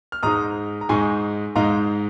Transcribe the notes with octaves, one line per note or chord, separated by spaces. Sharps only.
F6
G#2 G#3 D#4 A#5 D#6
A#5
G#2 G#3 D#4 G#5 C#6
G#2 G#3 D#4 F5 A#5